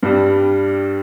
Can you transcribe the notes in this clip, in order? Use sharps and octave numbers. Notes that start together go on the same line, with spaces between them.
G2 G3 D4